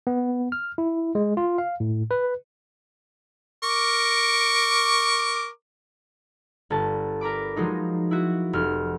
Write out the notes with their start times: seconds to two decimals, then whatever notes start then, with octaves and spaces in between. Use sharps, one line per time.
0.07 B3
0.52 F6
0.78 E4
1.15 G#3
1.37 F4
1.58 F5
1.80 A2
2.11 B4
3.64 A#4 C#6 D6
6.70 G1 G2 A5
7.21 A#4 A#5 B5 D6
7.56 F3 F#3 G#3 D#4
8.11 E4 F#4
8.53 F1 F6